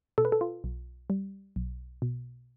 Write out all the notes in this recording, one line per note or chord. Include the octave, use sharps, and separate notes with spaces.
B2 A4
B4
A4
F4
B1
G3
B1
B2